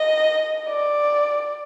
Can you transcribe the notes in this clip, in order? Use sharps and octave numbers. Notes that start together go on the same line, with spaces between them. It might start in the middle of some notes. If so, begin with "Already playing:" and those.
Already playing: D#5
D5